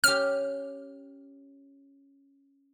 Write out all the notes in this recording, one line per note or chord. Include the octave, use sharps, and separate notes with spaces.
C#4 G4 F6